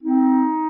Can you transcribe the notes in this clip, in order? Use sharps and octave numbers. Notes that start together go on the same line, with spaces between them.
C4 D#4